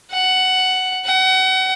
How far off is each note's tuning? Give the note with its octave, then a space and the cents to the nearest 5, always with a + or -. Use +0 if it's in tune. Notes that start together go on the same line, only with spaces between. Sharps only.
F#5 +10
F#5 +30